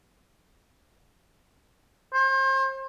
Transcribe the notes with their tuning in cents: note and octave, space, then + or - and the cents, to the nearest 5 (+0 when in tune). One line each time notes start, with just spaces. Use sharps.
C5 +35